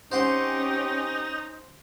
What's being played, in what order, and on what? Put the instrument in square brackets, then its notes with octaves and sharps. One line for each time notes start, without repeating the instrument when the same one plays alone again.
[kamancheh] C4 G4 [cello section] C#4 [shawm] D#4 [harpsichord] C5 F#5 C6